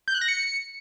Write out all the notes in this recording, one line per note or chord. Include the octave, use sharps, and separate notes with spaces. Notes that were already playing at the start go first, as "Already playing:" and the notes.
G6
F#6
A#6
C#7